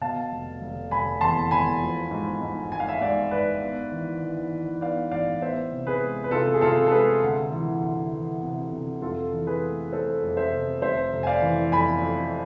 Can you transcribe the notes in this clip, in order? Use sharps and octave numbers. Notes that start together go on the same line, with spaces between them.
B2 F5 A5
F1
F1
F1 G#5 B5
E2 A5 C6
E2 G#5 B5
F3
G#2
G#2
G#1 G#5
F5
E5 G#5
G#2 D5 F5
G#1 B4 D5
B3
E3
E3
E3
B3 D5 F5
A1 D5 F5
B3 C5 E5
C3
G#4 B4
G#3
B4
C3 F4 A4
G#4
C3 F4 A4
A4
G#3 G#4 B4
D2
E3
D2
E3
C3
C3
F2 F4 A4
E3
G#4 B4
A3
A3 A4 C5
F2
C5 E5
C3
F1 C5 E5
F1
G#5
D5 F5
E3
F2 G#5 B5
F2